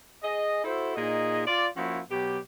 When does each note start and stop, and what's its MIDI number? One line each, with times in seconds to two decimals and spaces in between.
0.22 0.62 68
0.22 0.62 75
0.64 0.95 64
0.64 0.95 66
0.64 0.95 69
0.64 0.95 72
0.96 1.43 46
0.96 1.43 63
0.96 1.43 68
0.96 1.43 75
1.46 1.67 65
1.46 1.67 74
1.76 2.00 53
1.76 2.00 58
1.76 2.00 61
1.76 2.00 64
1.76 2.00 66
2.10 2.38 47
2.10 2.38 54
2.10 2.38 67